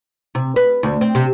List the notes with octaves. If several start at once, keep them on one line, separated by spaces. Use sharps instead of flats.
C3
B4
D2
C4
C3